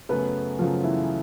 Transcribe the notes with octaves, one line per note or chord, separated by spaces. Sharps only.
F#2 C#3 F#3 A3 B3 B4
F#2 C#3 F3 F#3 A3 F4
E3 E4